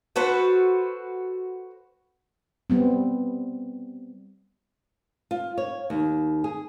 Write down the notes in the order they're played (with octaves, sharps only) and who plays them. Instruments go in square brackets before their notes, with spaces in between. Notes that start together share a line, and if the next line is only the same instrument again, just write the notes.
[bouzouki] F#4 A4 B4 C5
[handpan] G3 B3 C4
[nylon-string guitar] F4
C#5
D#2
G#4